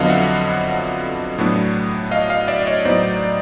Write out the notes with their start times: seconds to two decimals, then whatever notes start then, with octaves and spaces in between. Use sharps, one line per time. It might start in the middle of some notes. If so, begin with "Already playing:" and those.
Already playing: F2 D3 F#3 B3 D#5 F5
0.10 E5 F#5
1.38 A2 F#3 B3 D4
2.11 D#5 F5
2.30 D#5 F5
2.48 D5 E5
2.67 C#5 D#5
2.85 A2 F#3 B3 D#4 C5 D5